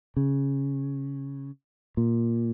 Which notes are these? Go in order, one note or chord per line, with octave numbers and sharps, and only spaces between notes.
C#3
A#2